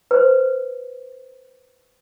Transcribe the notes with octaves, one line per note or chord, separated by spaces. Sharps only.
B4 C5